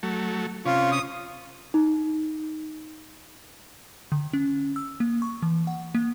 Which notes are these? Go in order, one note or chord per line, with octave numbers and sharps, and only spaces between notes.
F#3 A3
C3 C#4 F4
D#6
D#4
D3
C#4
E6
A#3
C#6
E3
F#5
A#3